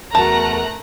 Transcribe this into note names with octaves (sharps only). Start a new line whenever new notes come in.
E2 A3 F#4 A#4 A5 A#5 F#6